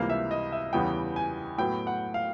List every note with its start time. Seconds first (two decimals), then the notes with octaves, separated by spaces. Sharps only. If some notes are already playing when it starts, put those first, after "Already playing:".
Already playing: C#2 C3 E3 G3 A#3 F5
0.10 E5
0.31 D#5
0.52 E5
0.73 E2 C#3 E3 G3 B3 G5
1.16 G#5
1.58 A2 F#3 B3 G5
1.87 F#5
2.14 F5